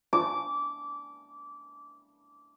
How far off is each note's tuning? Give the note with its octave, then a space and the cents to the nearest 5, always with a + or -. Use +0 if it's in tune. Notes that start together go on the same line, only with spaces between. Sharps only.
D6 -20